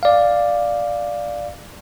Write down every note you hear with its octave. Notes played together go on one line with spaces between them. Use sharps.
D5 F5